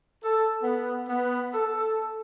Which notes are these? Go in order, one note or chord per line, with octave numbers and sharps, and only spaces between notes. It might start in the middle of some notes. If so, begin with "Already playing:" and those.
A4
B3
B3
A4